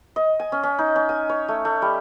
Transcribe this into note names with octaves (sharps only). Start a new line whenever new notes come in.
D#5
G#5
C#4
C#4
D#4
C#4
G#5
C#5
A3
A3
G3